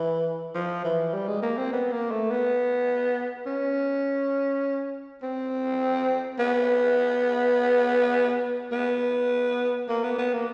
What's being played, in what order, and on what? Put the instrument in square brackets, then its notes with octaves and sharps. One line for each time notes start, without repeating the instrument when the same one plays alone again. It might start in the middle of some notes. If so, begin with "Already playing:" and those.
Already playing: [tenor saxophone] E3
F3
E3
G3
G#3
A#3
C4
B3
A#3
A3
B3
C#4
C4
B3
B3
A#3
B3
B3
A#3